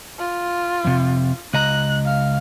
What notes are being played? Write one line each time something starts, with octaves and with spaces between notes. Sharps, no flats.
F4
F2 C3
C#2 D#5 A#5 F#6
F5